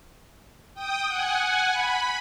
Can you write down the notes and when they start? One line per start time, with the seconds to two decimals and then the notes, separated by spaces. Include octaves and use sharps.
0.74 G5 D#6
1.07 F#5 G#5
1.72 B5